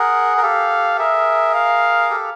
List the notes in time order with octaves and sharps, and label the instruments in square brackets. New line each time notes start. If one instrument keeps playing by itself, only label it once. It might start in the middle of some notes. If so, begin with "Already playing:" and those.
Already playing: [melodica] G#4 A#4 [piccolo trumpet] F#5
[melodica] A#4
[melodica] G4 A4 [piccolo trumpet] F5
[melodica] G#4 A#4 [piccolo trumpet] E5
[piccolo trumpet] F5
[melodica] G4 A4